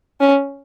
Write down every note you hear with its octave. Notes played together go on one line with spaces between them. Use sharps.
C#4